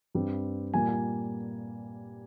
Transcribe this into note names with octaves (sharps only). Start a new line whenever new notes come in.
G2 G3 C4
A#2 G3 A#3 G#5
G#5